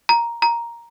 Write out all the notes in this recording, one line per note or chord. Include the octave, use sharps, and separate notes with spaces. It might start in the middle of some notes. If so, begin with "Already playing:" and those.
A#5
A#5